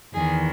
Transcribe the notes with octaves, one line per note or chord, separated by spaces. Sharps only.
E2 D#3 G#4